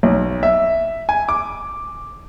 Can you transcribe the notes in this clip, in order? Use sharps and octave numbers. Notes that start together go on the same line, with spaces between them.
B1
E5
G#5
D6